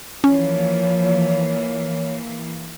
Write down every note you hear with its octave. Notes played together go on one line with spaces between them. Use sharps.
E3 F3 A#3 C#4 C#5